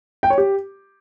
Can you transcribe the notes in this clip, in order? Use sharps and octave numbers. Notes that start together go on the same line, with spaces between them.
G5
C#5
G4